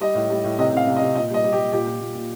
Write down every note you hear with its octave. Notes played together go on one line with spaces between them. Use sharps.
G3 D#5
A2
G3
A2
C3 D#5
C3 F5
C3
D#5
C3
A#2 D#5
G3 D#5
G3
G4
G3
A#2 G4
A#2
A#2
A#2